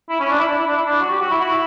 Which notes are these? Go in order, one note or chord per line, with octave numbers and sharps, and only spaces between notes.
E4
C#4
D4
E4
D4
E4
D4
E4
D4
F#4
G4
F#4
E4
F#4
E4